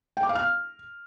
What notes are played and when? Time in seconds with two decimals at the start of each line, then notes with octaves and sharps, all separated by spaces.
0.17 G5
0.23 D6
0.29 F5
0.35 F6